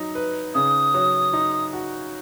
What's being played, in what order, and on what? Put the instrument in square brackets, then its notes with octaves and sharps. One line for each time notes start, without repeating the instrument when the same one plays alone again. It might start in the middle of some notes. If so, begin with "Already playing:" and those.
Already playing: [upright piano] F#3 D#4
B4
[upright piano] C#3 [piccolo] D#6
[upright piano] F#3
D#4
F#4